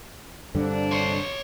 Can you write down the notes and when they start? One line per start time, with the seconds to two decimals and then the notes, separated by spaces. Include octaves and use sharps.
0.55 G2 D3 G3 A#3 C4 D4
0.91 C#5 C6